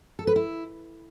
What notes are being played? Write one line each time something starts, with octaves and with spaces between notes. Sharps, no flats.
A4
B4
E4